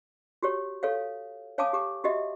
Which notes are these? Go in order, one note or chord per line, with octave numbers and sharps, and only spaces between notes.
F#4 G4 C#5
A4 C#5 F5
C#5 F5 G#5 A5 D6 D#6
G4 D6
F#4 G4 D#5 E5